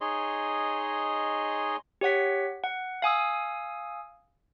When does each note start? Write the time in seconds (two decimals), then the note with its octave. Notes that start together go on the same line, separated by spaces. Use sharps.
0.01 D#4 G#4 C#5 D#5 C6
2.01 G4 C#5 F#5 B6
2.64 F#5
3.02 F5 G#5 D#6 E6